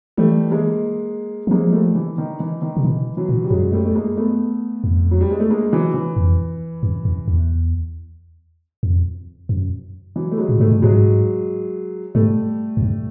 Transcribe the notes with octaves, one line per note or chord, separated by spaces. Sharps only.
E3 G3 A3
G#3 A#3
E3
F3 G#3 A#3
G3 A3
E3
D#3
E3
D#3
C3
B2 E3
E3 F#3
A#2
G3
F#2 F#3 G#3
G3 A3
A3
G#3 A#3
A3 B3
F2
F#3
G3
G#3
A3
G#3 A#3
E3 F#3
E3
F2
F#2
F2
E2
F2
F#2
E3 F#3
A3
F#3 G#3
A2
G#2 G3 A3
G2
G#2 F#3 G#3
G#2 G3 A3
F#2
G2